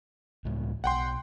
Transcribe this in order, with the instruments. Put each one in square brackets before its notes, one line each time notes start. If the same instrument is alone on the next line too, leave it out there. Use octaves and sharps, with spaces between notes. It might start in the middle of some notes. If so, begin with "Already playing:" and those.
[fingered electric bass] C#2 A2 G#3
[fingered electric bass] B1 [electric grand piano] F#5 G5 C6